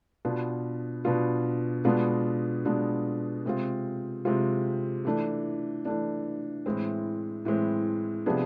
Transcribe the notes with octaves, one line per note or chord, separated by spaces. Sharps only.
B2 B3 D4 F4
B2 B3 D4 F4
B2 G#3 B3 D4 F4
B2 G#3 B3 D4 F4
C3 G#3 C4 F4
C3 G#3 C4 F4
E3 A3 D4
E3 A3 D4
A2 E3 G#3 C4
A2 E3 G#3 C4
C3 F3 B3 D4 G#4